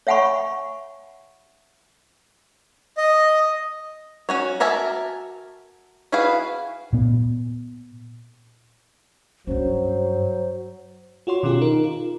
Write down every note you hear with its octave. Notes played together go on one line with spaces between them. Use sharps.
C#5 E5 F#5 G#5 B5 C#6
D#5
C#4 F#4 C#5
F#4 A#4 E5 G#5 A5
E4 F#4 G#4 B4 F5
A#2 B3
G2 F#3 C#4 C5
F4 F#4 C#5 C6
B2 D#3 C#4 F4 G4 G#4
D#4 A#4
F4